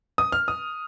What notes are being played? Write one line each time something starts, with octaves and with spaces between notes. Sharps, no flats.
D#6
F6
D#6